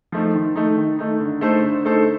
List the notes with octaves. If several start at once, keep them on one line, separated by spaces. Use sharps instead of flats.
F3 A3 D#4
D#3
A3 D#4
D#3
A3 D#4
D3
A3 D#4 A4 C5
D3
A3 D#4 A4 C5